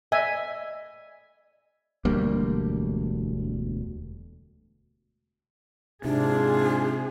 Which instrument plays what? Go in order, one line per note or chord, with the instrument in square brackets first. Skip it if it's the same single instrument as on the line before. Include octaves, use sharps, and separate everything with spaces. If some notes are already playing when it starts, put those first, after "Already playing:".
[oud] D#5 [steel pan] E5 G#5
[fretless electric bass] E1 D2 G3 A#3
[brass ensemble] G#2 F4 [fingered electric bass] C3 [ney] D4 [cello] G#4